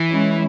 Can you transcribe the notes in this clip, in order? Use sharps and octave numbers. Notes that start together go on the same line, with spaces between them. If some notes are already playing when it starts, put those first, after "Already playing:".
Already playing: E3
G#3 C#4 E4